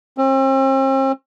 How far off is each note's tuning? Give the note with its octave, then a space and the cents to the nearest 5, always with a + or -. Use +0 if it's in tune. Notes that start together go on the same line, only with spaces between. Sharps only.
C4 +40